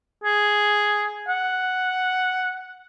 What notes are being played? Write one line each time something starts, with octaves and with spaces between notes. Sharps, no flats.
G#4
F#5